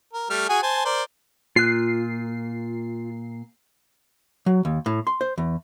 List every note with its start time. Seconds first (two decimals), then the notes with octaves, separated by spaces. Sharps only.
0.13 A#4
0.30 G3 A3 F6
0.49 F#4 G#4 G#5
0.63 C5 G#5 A5
0.85 A#4 C5 D5
1.56 A#2 F4 F#6 C7
4.46 F#3
4.65 D#2
4.86 A2
5.07 C6
5.21 C5
5.38 E2